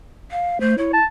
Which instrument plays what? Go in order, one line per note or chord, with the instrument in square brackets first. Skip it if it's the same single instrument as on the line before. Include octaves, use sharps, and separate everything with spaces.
[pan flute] F5
[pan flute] A3 [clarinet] C5
[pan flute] E4 [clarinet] C#5
[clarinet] A5